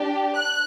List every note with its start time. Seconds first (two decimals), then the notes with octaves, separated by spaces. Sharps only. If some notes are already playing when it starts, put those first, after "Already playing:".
Already playing: D4 G4
0.37 F#6